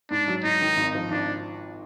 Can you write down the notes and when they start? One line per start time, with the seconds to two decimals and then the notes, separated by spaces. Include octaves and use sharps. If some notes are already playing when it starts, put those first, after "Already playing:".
0.11 G#2 D4
0.28 F#3
0.44 G#2 D#4
0.61 D#3
0.77 G#1
0.95 F3
1.11 G#1 D4